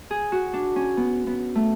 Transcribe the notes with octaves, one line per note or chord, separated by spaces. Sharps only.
G#4
F#4
D4
C#4
B3
B3
A3